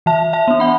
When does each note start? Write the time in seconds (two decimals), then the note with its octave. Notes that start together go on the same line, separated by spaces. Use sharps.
0.06 E3 E5 A5
0.33 E5 A5
0.48 B3 D4
0.60 F#5 B5